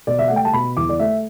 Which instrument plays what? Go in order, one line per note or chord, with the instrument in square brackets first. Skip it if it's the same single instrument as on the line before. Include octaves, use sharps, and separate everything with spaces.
[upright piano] B2 D5
E5
A3 F#5
G5
A5
B2 B5
E2 D6
D5
A3 E5